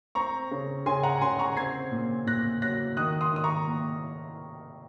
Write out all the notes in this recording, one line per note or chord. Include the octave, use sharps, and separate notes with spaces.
C4 A#5 C#6
C#3
C#3 G#5 C6
F#5 A#5
C#3 G#5 C6
A#5 C#6
C4 G#6 C7
A#2
A#2 F#6 A#6
F#3 F#6 A#6
D#3 D#6 F#6
C6 D#6
D#3 D#6
A#5 C#6
A#3